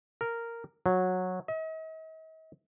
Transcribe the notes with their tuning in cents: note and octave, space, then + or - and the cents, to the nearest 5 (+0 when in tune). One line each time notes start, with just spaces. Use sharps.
A#4 -5
F#3 -15
D#5 +45